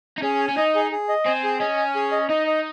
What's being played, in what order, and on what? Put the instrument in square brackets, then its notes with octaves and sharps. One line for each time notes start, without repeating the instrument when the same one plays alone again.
[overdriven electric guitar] D#4
[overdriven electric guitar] C#4 [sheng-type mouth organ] G#4
[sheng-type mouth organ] G#5
[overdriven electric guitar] C#4
[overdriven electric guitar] D#4 [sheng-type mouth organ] D#5
[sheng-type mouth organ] G#4
G#4
D#5
[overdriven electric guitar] C4 [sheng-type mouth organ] G#5
[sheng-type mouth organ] G#4
[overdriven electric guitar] C#4 [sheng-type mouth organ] D#5
[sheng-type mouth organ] G#5
G#4
D#5
[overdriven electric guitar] D#4 [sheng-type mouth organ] D#5
[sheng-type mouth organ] D#5